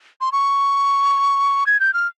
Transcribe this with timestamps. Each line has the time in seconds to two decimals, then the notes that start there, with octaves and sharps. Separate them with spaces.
0.21 C6
0.32 C#6
1.67 G#6
1.80 G6
1.94 F6